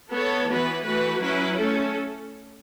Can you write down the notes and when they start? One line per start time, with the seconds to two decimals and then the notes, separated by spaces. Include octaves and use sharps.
0.10 B3 A4 C#5
0.47 E3 B3 F#4 B4
0.84 E3 A3 F#4 B4
1.22 F#3 C#4 E4 B4
1.59 A3 C#4 A4